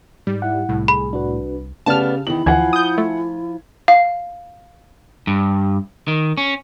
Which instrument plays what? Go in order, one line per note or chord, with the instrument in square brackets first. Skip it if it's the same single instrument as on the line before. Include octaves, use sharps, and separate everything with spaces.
[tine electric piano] G#2 [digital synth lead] G3
[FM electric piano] E4 F#5
[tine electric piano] C2 [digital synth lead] A2
[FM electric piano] G#4 [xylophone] B5
[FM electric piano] D4 F#4 B4
[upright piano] C#3 G4 [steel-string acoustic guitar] A3 B3 D5 [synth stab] A5 F6
[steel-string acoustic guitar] E2 D#3 [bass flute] E4 [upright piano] F#7
[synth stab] D2 E3 [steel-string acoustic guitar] F3 F4 [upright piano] F#5 G#5 G#6
[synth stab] D#6 G6
A3
[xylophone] F5
[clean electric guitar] G2
D#3
C#4